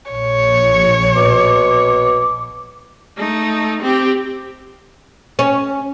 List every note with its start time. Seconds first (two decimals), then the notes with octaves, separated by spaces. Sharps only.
0.12 A#1 C#5
1.16 B2 D6
3.17 A3 D#4
3.82 C4 G4
5.39 C#4